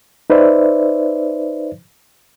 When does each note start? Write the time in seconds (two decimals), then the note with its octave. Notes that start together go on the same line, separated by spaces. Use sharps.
0.30 D#4 B4 C5 D5 E5